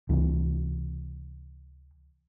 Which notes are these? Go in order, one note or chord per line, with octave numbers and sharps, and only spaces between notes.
C#2 C3 E3